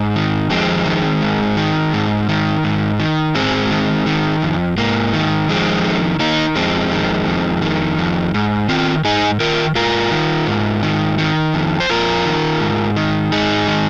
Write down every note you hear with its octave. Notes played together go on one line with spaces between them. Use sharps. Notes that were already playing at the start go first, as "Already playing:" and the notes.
Already playing: G#2
D#3
F2 G#3 C4
D#3
G#2
D#3
G#2
D#3
G#2
D#3
G#2 G#3 C4
D#3
D#3
F2
G#2 A#3
D#3
F2 G#3 C4
D#3
D#3 A#3 D#4
F2 G#3 C4
D#3
F2
D#3
F2
G#2
D#3 C4 F4
G#2 D#4 G#4
D#3 F4 A#4
G#2 F4 A#4
D#3
G#2
D#3
D#3
F2
C5
F2 F4 A#4
D#3
G#2
D#3
G#2 D#4 G#4
D#3